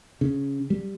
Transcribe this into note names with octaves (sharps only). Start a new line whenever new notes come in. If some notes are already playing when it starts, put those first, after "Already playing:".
C#3
G3